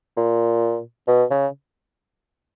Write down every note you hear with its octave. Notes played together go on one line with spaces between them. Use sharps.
A#2
B2
C#3